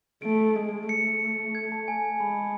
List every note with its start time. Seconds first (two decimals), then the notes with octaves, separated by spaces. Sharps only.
0.22 A3 D7
0.55 G#3
0.89 A3 C#7
1.55 G#6
1.72 A5
1.88 G#5
2.05 G#5
2.20 G#3 B5